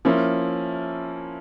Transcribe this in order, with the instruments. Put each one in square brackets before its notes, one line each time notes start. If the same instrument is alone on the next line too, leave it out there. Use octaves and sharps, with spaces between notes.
[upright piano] F3 A#3 C#4 E4